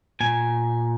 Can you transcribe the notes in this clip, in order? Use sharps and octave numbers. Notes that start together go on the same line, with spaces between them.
A#2 G#5